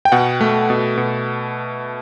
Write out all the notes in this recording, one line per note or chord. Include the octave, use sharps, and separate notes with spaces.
G5
B2 F#5
A3
B2
B2